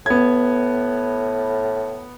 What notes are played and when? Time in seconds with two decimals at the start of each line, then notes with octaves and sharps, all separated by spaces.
0.06 A2 B3 G#6